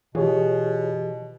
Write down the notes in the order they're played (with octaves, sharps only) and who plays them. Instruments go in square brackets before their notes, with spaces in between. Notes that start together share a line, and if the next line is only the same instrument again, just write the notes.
[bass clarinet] B2 [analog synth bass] E3 [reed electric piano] F4 G#4 C#5 [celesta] G4